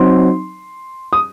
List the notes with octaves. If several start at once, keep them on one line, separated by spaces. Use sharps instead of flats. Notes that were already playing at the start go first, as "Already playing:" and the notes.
Already playing: F#3 C4 D#4 C6
D#6